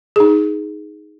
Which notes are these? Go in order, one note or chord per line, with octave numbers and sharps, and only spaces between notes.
D#4 G#4